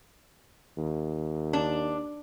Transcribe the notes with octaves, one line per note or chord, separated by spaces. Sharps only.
D#2
D4